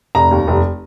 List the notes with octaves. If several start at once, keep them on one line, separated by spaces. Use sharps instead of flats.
F1 A#5
D#2
F1